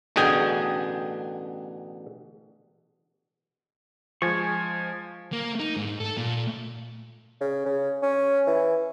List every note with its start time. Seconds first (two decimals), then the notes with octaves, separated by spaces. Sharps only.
0.16 A1 B2 D3 G#4 G5 G#5
4.22 F3 G#3 G#5 C#6
5.32 A#3
5.60 D#4
5.77 G#2
6.00 A4
6.17 A#2
7.41 C#3
7.66 C#3
8.02 C#4
8.47 E3